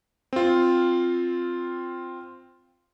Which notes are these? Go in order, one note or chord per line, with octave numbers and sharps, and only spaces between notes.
C4 F4